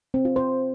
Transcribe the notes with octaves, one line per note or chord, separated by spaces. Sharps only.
C4
F4
C5